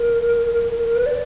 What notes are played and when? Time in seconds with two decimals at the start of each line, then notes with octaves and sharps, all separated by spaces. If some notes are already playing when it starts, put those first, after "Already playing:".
Already playing: A#4
0.85 A#4
0.96 B4
1.06 D5